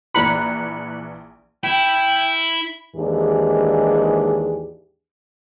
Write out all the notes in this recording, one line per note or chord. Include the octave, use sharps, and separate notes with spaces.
A#1 E3 A#5 B5 F#6 C#7
E4 G5
D#2 G#2 E3 D4 G4 G#4